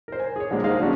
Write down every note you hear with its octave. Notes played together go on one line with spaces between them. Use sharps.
A#4 C5
G#5
G#4 C#5
D3 F3 G3 G#3 A#3
G#3 A#3 D#4 C5 F5
D3 F3 F#3 G#3 C#4 D4